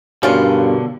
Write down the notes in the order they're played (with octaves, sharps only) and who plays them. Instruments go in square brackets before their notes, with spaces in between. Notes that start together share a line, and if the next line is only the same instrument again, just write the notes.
[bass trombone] G2 [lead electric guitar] B2 D3 [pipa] C#4 F4 [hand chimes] F#4 A#4 C#5